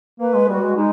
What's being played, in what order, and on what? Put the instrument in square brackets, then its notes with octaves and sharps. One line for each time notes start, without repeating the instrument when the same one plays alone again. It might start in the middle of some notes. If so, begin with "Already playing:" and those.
[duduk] A#3 [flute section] B4
[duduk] G#3
[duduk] G3 [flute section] F#4
[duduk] G#3
[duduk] G#3 [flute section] D#4